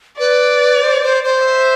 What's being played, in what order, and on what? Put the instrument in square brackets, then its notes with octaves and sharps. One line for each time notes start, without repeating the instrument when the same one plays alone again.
[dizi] B4 [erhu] D5
[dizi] C5
C5
C5
[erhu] E5